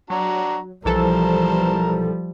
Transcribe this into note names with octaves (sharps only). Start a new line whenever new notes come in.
F#3 D4 F#4 A#5
B1 E3 F3 G3 A4 A#4 C5 A5